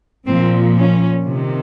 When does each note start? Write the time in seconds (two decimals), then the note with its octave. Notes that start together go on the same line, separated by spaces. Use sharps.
0.25 A#2 F3 C4
0.76 C#4
1.25 C3 D#3